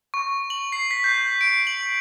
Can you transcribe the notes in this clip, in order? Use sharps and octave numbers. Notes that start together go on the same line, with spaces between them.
C#6
F#7
C7
B6
G6
D7
F#7